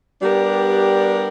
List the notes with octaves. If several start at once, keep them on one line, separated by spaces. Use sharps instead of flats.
G3 B3 D4 G4 A#4